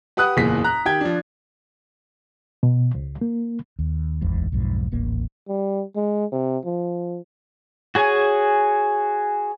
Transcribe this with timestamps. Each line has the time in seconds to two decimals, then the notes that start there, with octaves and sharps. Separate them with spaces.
0.17 G4 B4 F#5 D#6 F#6
0.37 F#1 E2 A#2 G#4 B6
0.64 A#5 F#6
0.85 D#3 G4 G5 G#6
1.01 F3 D4
2.63 B2
2.95 C#2
3.21 A#3
3.79 D#2
4.22 D1 G#1 E2 G#2
4.52 B1 F2 G#2
4.92 D#1 A1 A#3
5.48 G3
5.96 G#3
6.32 C3
6.65 F3
7.95 F#4 G#4 C#5 G#5